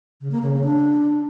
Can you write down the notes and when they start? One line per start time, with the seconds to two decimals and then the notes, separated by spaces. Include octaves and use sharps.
0.21 C#3
0.32 A#3
0.42 C#3
0.53 C#3
0.64 D4